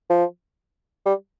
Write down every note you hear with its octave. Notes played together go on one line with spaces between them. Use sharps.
F3
G3